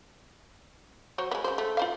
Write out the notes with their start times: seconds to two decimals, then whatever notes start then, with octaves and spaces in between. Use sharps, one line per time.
1.18 F#3 C5 C#5
1.31 G#3 B3
1.44 C#3 C5
1.58 A3
1.77 F4 C5 F5